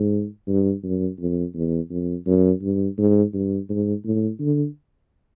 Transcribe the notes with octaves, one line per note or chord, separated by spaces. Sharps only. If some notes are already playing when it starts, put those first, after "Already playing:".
Already playing: G#2
G2
F#2
F2
E2
F2
F#2
G2
G#2
G2
G#2
A2
D3